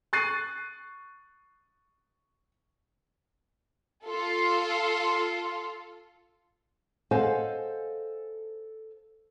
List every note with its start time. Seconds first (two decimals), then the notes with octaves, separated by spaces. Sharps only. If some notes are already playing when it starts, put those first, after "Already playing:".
0.13 C#6 F#6 A6 C7 D#7
4.05 F4 A4
7.11 A4 C5 D#5 F5 F#5 G#5